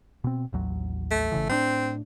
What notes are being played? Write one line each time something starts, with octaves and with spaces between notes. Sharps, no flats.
B2 C4
A1 D#2 F#3
A3
G#1 C#3 E3
A2 F#3 C4 D4